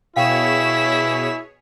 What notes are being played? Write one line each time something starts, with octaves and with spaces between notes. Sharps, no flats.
B2 E4 G#4 C#5 F5 G5 B6 E7